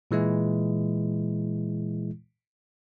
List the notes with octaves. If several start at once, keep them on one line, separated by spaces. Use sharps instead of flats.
A#2 E3 G#3 E4